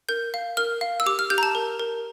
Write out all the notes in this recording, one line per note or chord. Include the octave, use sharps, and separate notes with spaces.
A#4 G6
F5
A#4 F6
F5
E6
G4 D6
F6
G4 G6
A#5
A5
A#4
A#4